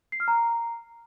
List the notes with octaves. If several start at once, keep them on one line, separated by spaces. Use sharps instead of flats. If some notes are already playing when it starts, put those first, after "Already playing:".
C7
F6
A#5